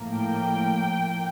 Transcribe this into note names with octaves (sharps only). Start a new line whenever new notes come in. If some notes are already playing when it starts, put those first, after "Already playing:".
Already playing: A2 F3 A#3
G5